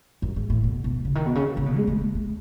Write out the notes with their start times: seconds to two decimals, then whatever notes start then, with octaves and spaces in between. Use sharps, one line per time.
0.22 F#2
0.36 G#2
0.50 A2
0.64 B2
0.84 B2
1.05 C#3
1.15 D#3
1.26 B2
1.35 C#3
1.57 C#3
1.66 B2
1.77 G#3
1.87 A3
2.01 G#3
2.15 A3